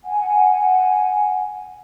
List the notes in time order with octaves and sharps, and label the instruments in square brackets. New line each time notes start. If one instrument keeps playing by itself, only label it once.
[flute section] F#5 G#5